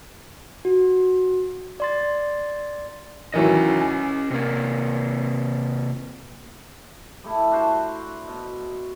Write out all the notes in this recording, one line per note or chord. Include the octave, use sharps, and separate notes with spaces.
F#4
D5 C6 A6
D#3 E3 F#3 C#4 D#5
G#5
C3 A#3
G3 A3 E4
D4 F#4 C5
B2